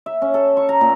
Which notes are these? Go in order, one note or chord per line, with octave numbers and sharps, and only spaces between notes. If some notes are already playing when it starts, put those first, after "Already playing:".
E5
C#4
A4
C#6
A#5
A#2